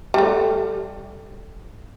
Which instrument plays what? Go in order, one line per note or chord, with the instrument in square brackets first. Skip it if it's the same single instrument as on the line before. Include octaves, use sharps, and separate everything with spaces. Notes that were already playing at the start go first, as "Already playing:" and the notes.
[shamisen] G3 A3